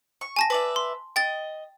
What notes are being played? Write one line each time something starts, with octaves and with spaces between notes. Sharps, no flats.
C#6
G#5 A5 A#6
B4 D5 E5
C6
D#5 G5 A6